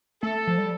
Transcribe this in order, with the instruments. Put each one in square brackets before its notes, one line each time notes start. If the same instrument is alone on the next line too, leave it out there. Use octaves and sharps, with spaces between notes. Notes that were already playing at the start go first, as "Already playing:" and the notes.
[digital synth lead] A3 [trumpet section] A4
[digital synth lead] F3
G3